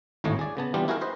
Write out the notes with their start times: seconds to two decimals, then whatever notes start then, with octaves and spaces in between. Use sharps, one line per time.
0.24 G#1 D2 A2 A3 C#5 D#5
0.39 G#4 D5
0.57 C#3 B3 A5
0.74 E3 G3 B3 D4 F4 G4
0.88 E4 F#4 G#4 A#4 F5 G5
1.01 B4 C5 D#5